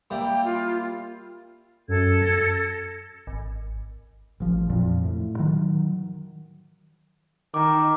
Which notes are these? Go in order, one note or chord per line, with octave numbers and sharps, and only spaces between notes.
G3 A#3 E4 G5
F4
F#2 A4 G#6
A#6
G#1
A1 F3
F2 A#2 F3
A2
D#3 F#3
D#3 A#5 D6